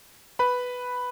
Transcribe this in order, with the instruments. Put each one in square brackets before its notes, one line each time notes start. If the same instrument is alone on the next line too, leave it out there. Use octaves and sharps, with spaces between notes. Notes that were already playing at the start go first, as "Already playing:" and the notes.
[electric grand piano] B4 B5